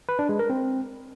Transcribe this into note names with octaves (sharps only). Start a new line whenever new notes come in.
B4
D4
G#3
A#4
C4